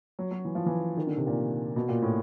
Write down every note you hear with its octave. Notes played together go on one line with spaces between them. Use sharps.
F#3
F#3
E3
F3
E3
D#3
D3
C3
A#2
B2
A#2
A2